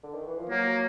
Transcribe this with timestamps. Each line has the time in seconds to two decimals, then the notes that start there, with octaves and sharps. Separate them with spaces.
0.03 D3
0.14 D#3
0.27 E3
0.38 F3
0.50 F#3 A#3